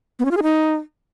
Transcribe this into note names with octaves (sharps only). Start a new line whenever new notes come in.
B3
C#4
F4
G#4
D#4